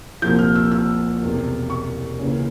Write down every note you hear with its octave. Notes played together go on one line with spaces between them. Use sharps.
C2 A#2 F3 G6
F6
E6
E6
E1 E2 C3
C#6
C#2 C#3 E3 A#3 C#4